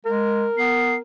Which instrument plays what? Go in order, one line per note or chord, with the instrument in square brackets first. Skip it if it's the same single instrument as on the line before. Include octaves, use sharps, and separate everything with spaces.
[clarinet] G#3 [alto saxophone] A#4
[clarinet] B3 [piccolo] C7